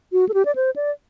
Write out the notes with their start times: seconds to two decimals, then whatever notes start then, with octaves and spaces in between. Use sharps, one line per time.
0.12 F#4
0.29 A4
0.34 G4
0.45 D5
0.56 C5
0.76 D5